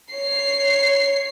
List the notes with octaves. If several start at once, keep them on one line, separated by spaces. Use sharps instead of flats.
C#5 C7